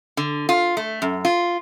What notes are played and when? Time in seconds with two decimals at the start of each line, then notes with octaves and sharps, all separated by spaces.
0.17 D3
0.49 F4
0.77 A3
1.02 F#2
1.25 F4